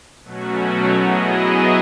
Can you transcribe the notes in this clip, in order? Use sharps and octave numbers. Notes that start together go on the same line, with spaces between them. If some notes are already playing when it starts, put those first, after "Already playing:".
B2 F#3 A3 C#4 F#4
F#3 B3 E4 G#4 D#5